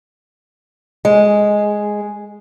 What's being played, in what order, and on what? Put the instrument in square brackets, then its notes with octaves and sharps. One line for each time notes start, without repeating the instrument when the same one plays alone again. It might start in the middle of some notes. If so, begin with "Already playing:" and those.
[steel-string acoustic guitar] G#3